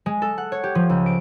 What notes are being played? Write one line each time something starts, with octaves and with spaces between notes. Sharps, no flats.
G#3
A4
F#5
C#5
G4
F3
C#2
D7